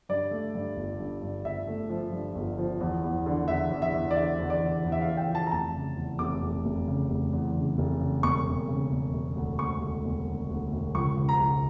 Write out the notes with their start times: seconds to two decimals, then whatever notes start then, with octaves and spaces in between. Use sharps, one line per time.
0.09 G2 D5
0.31 A3
0.55 G2
0.76 G1
0.99 G2
1.22 G2
1.45 G1 E5
1.67 A3
1.90 F3
2.12 G2
2.35 G1
2.58 F3
2.80 E2
3.04 E2
3.26 D3
3.48 E2 E5
3.71 E2
3.82 E5
3.93 E2
4.11 D5
4.16 D3 E5
4.39 E2
4.50 D5
4.61 E2
4.85 E2
4.92 E5
5.01 F5
5.07 E2
5.17 G5
5.29 F3
5.35 A5
5.47 A#5
5.52 F1 A5
5.74 C#3
5.97 E2
6.19 F1 D6
6.42 F1
6.65 F1
6.87 C#3
7.10 F1
7.32 E2
7.55 C#3
7.78 F1
8.00 C#3
8.23 E1 C#6
8.46 E1
8.68 C#3
8.91 E1
9.13 E1
9.36 D2
9.58 E1 C#6
9.81 D2
10.05 E1
10.27 D2
10.50 D2
10.72 E1
10.95 C#2 C#6
11.17 C#2
11.29 A#5
11.40 C#2